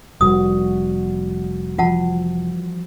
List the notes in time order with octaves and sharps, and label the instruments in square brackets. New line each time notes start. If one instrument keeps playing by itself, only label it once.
[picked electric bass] F1 [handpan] G3 F#4 [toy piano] D#6
[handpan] E3 F3 [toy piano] F4 F#5 A5